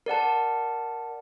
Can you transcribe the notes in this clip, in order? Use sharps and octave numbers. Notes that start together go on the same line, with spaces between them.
A#4 D5 F#5 A5